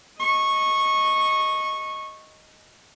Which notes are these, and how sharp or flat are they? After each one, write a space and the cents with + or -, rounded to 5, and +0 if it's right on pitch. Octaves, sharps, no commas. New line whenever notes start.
D#5 +0 C#6 -15